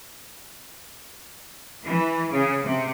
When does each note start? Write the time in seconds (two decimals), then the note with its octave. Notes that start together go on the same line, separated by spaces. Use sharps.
1.84 E3
2.30 C#3
2.62 C3